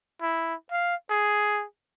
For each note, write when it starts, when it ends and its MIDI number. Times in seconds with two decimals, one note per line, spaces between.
0.21 0.54 64
0.71 0.95 77
1.10 1.64 68